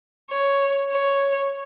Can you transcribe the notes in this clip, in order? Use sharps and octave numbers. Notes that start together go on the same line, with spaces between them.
C#5
C#5